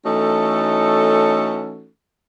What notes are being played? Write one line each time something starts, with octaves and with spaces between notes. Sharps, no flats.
E3 A3 C#4 D#4 F#4 A4